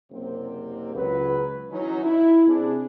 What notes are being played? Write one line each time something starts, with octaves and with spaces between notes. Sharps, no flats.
F#1 C3 A#3 C4
C#2 F#3 B4
E3 F#3 C#4 D#4
E4
C3 D4 G#4